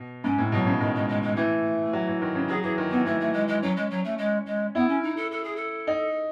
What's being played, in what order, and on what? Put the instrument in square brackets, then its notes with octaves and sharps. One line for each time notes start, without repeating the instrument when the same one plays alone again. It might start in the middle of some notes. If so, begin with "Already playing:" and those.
Already playing: [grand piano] B2
[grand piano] G#2 [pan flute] C#4
[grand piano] A2
[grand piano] B2 [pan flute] F#3
[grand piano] C#3
[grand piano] D#3 [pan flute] G#3
[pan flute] G#3
G#3
G#3
[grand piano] E3 [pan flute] A3
[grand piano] F#3
E3
D#3
C#3
[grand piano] F#3 [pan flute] G#4
[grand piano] E3 [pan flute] G#4
[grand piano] D#3
[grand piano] E3 [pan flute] B3
[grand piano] E3 [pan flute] A3
[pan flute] A3
G#3
G#3
[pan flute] F#3 [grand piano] C#4
[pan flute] G#3
F#3
A3
G#3
G#3
[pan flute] B3 [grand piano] E4
[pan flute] C#4
D#4
A4
A4
G#4
A4
[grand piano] D#4